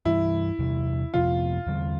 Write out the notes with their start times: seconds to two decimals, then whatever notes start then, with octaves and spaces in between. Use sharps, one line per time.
0.05 G2 E3 G3 E4
0.59 E2 C3 G3
1.14 F2 C3 F3 B3 F4
1.67 E2 D3 G3 C4